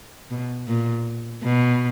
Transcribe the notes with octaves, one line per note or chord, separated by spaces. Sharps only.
B2
A#2
B2